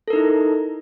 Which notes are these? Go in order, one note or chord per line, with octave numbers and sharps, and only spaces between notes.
D#4 E4 A4 A#4